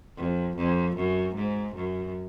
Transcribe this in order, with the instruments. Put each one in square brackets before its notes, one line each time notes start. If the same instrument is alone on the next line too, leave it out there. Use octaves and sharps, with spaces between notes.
[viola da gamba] F2
F2
F#2
G#2
F#2